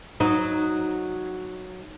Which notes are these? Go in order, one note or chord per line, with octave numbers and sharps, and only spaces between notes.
F#3 D#4